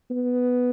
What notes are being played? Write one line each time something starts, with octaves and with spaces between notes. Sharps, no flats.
B3